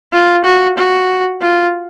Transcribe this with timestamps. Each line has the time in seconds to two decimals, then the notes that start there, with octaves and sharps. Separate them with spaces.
0.13 F4
0.44 F#4
0.77 F#4
1.42 F4